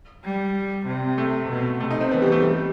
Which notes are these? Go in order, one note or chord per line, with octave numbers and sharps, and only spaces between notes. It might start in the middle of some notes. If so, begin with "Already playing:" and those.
G3
C3
A3
B2
C3 A3
D#4
C4
E3 B3
G3
A3
G3